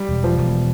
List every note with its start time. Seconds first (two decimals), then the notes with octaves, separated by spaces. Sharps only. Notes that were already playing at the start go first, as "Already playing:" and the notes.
Already playing: G3
0.09 E1
0.24 F3
0.38 E1